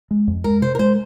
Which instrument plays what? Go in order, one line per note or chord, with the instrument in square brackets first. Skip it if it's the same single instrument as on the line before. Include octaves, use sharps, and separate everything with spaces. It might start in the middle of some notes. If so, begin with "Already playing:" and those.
[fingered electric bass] G#3
F2
[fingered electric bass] G#3 [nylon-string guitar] A#4
[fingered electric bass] C3 [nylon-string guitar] C5
[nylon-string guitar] A#4
[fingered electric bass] G#3 [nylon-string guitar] C5